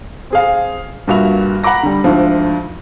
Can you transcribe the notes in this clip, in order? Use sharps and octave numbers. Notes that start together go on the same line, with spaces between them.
C4 G#4 F5
G2 A#2 F#4 E5 F7
F#5 A#5 B5 D6 A#6
D3 G3
D2 G#2 D3 F3